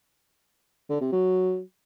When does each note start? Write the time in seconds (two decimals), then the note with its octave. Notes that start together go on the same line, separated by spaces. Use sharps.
0.89 D3
1.01 C3
1.13 F#3